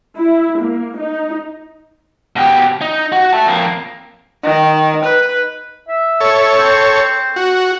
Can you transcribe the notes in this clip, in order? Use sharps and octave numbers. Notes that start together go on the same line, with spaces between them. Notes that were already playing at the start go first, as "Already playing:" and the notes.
E4
A#3
D#4
B2 G4
D#4
F#4
E5 A5
F2 A#3
D#3
B4
E5
A4 C#5
C4
F#4